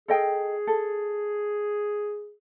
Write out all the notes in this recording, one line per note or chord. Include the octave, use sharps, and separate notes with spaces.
G#4 A4 D#5 G5
A4